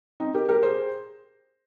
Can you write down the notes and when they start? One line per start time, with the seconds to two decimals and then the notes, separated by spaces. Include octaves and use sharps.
0.20 C4 D#4
0.34 G4 A#4
0.48 G4 A#4
0.62 G#4 C5